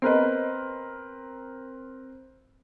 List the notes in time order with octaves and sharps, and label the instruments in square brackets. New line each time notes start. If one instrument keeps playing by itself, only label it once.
[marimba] B3 D#5 [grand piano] C4 A#4 B4